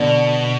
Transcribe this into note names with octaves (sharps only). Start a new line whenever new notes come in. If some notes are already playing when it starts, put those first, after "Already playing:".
Already playing: B2 D3